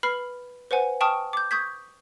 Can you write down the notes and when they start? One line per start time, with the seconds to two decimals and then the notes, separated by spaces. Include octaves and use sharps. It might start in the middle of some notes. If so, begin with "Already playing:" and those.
0.03 B4 B5 F6 C7
0.71 B4 C5 F#5 G#5
1.01 G5 A5 C#6 D#6 F6
1.33 D6 G6
1.51 C#6 D#6 G6 G#6 B6